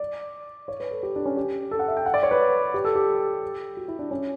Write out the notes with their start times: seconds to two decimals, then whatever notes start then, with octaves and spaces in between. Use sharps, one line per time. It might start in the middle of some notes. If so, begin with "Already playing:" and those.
Already playing: D5
0.68 C#5
0.80 B4
0.91 A4
1.03 G4
1.16 D4
1.26 C#4
1.37 G4
1.71 A4
1.79 F#5
1.88 E5
1.97 G5
2.06 F#5
2.14 D5
2.23 C#5
2.31 B4
2.74 G4
2.85 A4
2.95 G4
3.77 F#4
3.88 E4
3.99 D4
4.11 C#4